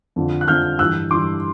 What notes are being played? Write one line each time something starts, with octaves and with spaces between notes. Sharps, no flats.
F2 D3 F3
F#6
F2 D3 F3 F6 G6
G2 E3 E6 F#6
G2 E3 C6 D6